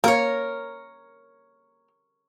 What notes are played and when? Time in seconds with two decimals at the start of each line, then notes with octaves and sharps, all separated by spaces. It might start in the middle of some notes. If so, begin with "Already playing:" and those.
0.04 A#3 A#4 C#5